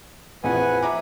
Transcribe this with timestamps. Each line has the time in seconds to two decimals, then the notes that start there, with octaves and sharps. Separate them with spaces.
0.44 A#1 F2 E3 B4 F#5 G#5
0.83 E5 A#5 D6